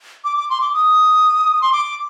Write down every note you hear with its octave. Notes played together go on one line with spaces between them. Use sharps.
D6
D6
C6
D6
D#6
C6
D6